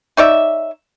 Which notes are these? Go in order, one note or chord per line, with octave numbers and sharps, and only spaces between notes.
D#4 C#5 D5 E5